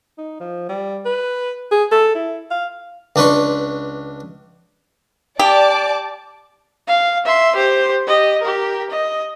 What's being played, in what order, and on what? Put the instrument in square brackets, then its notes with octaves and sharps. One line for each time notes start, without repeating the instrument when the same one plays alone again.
[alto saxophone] D#4
F3
G3
B4
G#4
A4
E4
F5
[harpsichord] C#2 D4 B4 C6 C#6
[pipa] G4 [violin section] D5 A5 D6
[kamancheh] F5
E5 C6
G4 C5
G4 D#5
G4 A#4
D#5